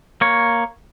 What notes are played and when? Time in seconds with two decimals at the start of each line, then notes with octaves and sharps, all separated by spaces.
0.21 A#3 C#5